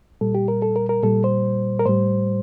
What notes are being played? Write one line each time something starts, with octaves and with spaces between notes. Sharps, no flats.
A#2 G3 A4
G4
A#4
A4
A#4
A#4
A#2 G3 A4
C5
A#4
A2 G3 C5